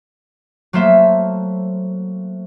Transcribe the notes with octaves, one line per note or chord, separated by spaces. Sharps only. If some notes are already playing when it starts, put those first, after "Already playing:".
F#3 A3 A#3 C5 E5